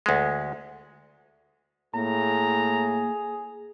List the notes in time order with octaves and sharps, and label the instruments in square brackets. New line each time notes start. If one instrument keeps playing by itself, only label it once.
[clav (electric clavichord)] D2 G#3
[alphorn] A2 [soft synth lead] A#3 [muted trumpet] G#4 [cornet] A#5